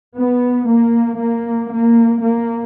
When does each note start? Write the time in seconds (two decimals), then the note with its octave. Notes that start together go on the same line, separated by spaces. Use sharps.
0.18 B3
0.69 A#3
1.20 A#3
1.72 A#3
2.24 A#3